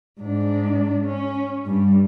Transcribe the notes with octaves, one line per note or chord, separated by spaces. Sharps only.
G#2 D4
C#4
G2